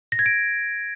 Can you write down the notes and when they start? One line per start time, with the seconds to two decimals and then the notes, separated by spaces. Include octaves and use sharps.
0.12 A#6
0.19 G#6
0.26 D7